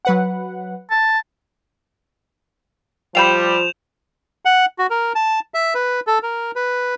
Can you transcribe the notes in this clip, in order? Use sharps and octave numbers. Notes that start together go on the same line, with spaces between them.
F#3 B4 F#5
A5
F3 G3 F5 G5 B5 G6 E7 F7
F#5
F#4
A#4
A5
E5
B4
A4
A#4
B4